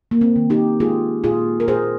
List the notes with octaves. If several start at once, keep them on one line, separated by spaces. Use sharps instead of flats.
A#3
C4
D#3
D#4 G4
G#3 F4 G#4
A#2 F4 G#4
A#4
A#2 G#4 C5